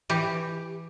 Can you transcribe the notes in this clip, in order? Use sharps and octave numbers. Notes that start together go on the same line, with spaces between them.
E3 G4